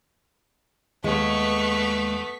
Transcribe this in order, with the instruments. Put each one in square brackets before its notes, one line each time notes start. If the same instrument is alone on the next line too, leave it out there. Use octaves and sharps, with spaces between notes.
[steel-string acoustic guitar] D#2 G#3 [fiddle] A3 B3 [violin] C#6 B6